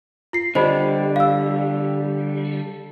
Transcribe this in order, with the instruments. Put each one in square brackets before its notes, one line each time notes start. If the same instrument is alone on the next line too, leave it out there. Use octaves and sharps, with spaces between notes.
[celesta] F4 C7
[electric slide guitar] D3 G3 D4 [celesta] C5 D#5 B5
[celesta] F5 E6